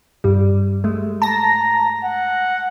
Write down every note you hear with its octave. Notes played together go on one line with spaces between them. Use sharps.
G2 G3
G#3 A3
A5 A#5 A#6
F#5